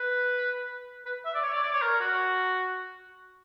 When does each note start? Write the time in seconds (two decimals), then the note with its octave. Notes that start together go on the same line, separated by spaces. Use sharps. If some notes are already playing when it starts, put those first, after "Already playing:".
Already playing: B4
1.05 B4
1.25 E5
1.35 D5
1.43 C#5
1.53 D5
1.63 D5
1.73 C#5
1.82 A#4
2.01 F#4